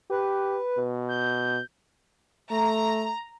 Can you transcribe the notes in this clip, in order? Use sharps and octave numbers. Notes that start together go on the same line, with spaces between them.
G4 B4
B2
G6
A3 A#5